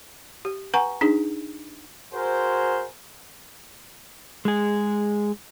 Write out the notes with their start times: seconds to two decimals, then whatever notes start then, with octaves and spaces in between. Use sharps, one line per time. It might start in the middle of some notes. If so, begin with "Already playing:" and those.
0.45 G4
0.74 B4 F#5 G#5 A#5 C#6
1.01 D4 D#4 G#4
2.14 F#4 G#4 A#4 C5
4.45 G#3 G#4